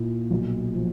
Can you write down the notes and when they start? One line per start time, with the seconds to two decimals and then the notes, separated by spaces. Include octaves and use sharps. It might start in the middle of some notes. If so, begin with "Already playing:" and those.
Already playing: A#2 E4
0.31 B1
0.74 F3